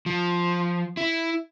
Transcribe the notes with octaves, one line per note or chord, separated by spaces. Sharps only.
F3
E4